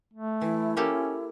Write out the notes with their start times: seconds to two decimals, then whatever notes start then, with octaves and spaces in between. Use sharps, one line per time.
0.14 A3
0.41 E3 E4
0.77 A#3 C#4 G4 A4